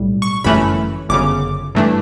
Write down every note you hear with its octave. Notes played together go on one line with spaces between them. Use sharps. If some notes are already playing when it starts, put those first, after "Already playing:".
Already playing: B1 A2 G3
C#6
G1 F#2 E3 A3 C#4 B5
G1 F#2 C#3 D6
G2 E3 A3 D4